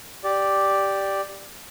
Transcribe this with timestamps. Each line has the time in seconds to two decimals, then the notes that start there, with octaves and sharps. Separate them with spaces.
0.24 G4 D5